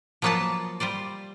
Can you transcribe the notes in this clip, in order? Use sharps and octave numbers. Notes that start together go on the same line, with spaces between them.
F3 F#3 A#3 B3 F4 A5
G3 F4 C5 D5